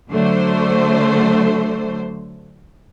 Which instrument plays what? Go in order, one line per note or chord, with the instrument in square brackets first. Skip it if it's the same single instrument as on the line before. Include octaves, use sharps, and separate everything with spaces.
[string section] D3 F#3 A3 C5